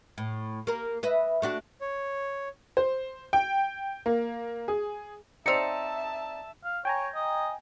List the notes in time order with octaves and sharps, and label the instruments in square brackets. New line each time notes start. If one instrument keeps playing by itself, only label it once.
[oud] A2
A#3 A#4
B4 D#5 E5
A3 D4 F#4
[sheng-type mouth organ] C#5
[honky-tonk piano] C5
G5
A#3
G#4
[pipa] C4 D#4 [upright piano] D5 E6 F7 [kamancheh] E5 A5 [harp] C#7
[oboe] F5
[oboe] C#5 [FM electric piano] G5 G#5 A#5
[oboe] D#5